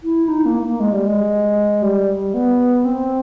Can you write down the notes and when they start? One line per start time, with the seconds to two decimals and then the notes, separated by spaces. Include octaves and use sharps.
0.03 E4
0.28 D#4
0.45 A#3
0.62 A#3
0.80 G#3
0.93 G3
1.07 G#3
1.82 G3
2.34 B3
2.85 C4